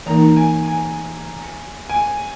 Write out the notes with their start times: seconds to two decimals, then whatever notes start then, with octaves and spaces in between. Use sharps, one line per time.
0.06 E3 A#3 D#4 A#4 A#5
0.37 G#5
0.67 G#5
1.89 G#5